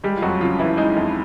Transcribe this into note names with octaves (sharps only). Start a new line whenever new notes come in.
G3 G#3 G4
F4
F2 F#3 F#4
C#3 F3 F4
E3 E4
G#3 D#4
F2